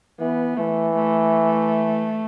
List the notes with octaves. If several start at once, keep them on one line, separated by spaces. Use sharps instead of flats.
E3 B3
E3 A3
A3